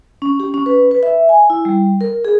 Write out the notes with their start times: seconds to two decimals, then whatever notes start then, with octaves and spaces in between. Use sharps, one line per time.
0.22 C#4
0.40 G4
0.54 C#4
0.66 B4
0.91 B4
1.03 E5
1.29 G#5
1.50 E4
1.65 G3
2.01 A#4
2.25 G#4